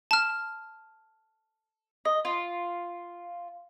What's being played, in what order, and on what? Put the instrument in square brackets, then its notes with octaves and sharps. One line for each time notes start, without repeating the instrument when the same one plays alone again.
[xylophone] A5 F6
[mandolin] D#5
F4